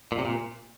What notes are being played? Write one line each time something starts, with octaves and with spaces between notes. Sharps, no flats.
A#2
C3
A#2